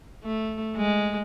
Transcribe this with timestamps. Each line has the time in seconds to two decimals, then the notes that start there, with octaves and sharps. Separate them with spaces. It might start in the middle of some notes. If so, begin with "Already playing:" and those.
0.23 A3
0.76 G#3